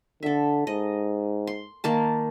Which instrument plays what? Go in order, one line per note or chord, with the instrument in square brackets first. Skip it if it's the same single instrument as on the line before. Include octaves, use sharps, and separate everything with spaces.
[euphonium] D3 [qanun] A4 E5
[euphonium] G#2 [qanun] D#5
[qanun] C6
D#3 A#3 A5